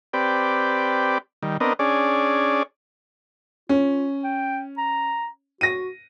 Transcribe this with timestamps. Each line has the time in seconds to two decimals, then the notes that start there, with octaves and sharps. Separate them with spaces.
0.13 C4 G4 B4 D5
1.43 D#3 G3
1.60 B3 C4 D4 A#4 D#5
1.79 C#4 D4 G#4 D5
3.69 C#4 F4
4.24 G5
4.78 A#5
5.61 F#4 A#6 D#7